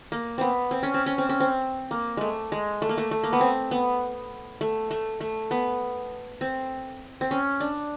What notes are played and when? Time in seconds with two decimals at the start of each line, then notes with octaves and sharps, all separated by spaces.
0.12 A#3
0.38 B3 C4
0.71 C4
0.83 C#4
0.94 C4
1.06 C#4
1.18 C4
1.29 C#4
1.40 C4
1.91 A#3
2.17 G#3 A3
2.52 G#3
2.82 A3
2.89 A#3
2.98 A3
3.11 A3
3.24 A#3
3.33 B3
3.41 C4
3.71 B3
4.61 A3
4.91 A3
5.21 A3
5.51 B3
6.41 C4
7.21 C4
7.31 C#4
7.60 D4